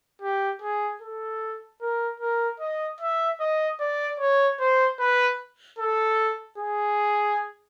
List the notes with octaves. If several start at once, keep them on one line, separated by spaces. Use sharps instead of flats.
G4
G#4
A4
A#4
A#4
D#5
E5
D#5
D5
C#5
C5
B4
A4
G#4